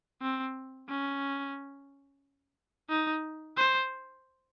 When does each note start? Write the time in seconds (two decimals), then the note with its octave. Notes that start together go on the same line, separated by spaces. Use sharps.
0.22 C4
0.89 C#4
2.89 D#4
3.57 C5